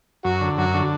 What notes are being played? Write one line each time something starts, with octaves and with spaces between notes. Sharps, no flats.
F#2 F#4
D3
F#2 F#4
D3